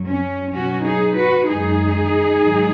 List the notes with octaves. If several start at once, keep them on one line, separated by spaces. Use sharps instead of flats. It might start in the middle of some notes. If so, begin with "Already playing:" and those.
Already playing: F#2 F#3
C#4
B2 F#3 C#4 F#4
D#4 G#4
F#4 B4
F#2 D#3 G#3 D#4 G#4
G#2 D#3 F#3